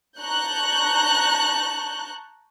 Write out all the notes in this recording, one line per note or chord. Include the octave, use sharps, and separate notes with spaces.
A5 A#5 C#6 F#6 G6